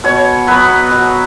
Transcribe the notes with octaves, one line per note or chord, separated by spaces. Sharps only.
B2 C#5
F#3 B3 B4
B2